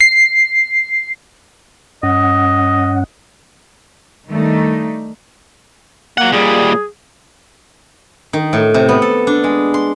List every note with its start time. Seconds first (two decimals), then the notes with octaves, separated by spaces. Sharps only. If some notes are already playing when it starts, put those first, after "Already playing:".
0.01 C7
2.03 G2 C#4 D#5 F#5
4.29 D#3 G3 A3 D4 D#4
6.17 F#3 A#3 F#5
6.32 A#2 G3 G#4
8.33 D#3
8.53 A2
8.74 C3
8.89 B3
9.02 A4
9.27 D4
9.44 G#3
9.74 C6